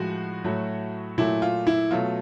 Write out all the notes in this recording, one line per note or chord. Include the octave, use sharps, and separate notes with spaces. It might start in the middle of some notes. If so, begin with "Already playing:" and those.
Already playing: A2 F3 G#3 F#4
A2 F#3 A3
A#2 F#3 A3 E4
F4
E4
B2 F#3 A3 F4